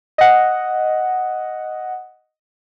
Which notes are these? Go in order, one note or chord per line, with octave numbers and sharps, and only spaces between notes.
D#5 F#5